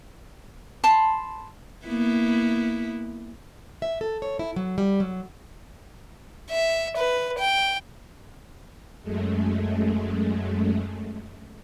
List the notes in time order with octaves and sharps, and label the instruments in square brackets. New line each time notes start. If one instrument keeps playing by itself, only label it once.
[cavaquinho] A5 B5 C6
[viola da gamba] A#3 B3 E4
[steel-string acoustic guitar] E5
A4
C#5
E4
F#3
G3
F#3
[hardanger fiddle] E5
B4
G5
[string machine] F#2 G#3 A3